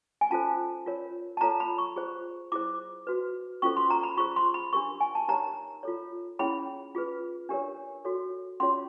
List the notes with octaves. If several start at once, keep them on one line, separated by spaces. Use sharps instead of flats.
G#5
C#4 F4 A4 C5 A5
F4 A#4 C#5
A5
F4 A4 C#5 A#5
B5
C#6
F4 G#4 C5
E4 G#4 C5 D6
F#4 B4
C#4 F4 A4 C5 C#6
C6
A#5
B5
F4 G#4 C5 C#6
C6
B5
D4 G4 A#4 C#6
G#5
A5
D#4 G4 A#4 C#5 A#5
F4 A4 C#5
C#4 E4 G#4 C#5 B5
F4 G#4 B4
D4 G4 A#4 C#5
F#4 A4 C#5
C#4 F4 G#4 C#5 C6